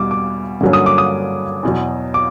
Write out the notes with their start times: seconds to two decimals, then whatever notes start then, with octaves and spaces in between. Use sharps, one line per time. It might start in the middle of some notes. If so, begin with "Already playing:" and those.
Already playing: E2 B2 G3 D6
0.11 D6
0.61 G2 D3 F#3 A#3 C#4
0.73 D#6
0.86 D6
0.98 D#6
1.63 E2 B2 F#3
2.14 D6